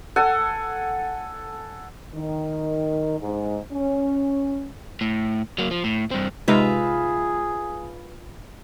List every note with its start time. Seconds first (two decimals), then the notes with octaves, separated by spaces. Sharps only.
0.16 A4 F#5 G#5
2.15 D#3
3.20 G#2
3.72 C#4
5.01 A2
5.58 F#3 A#3
5.71 F3
5.84 A2
6.11 G2 C4
6.48 C3 G#3 D#4 F4 G#4 B4 E5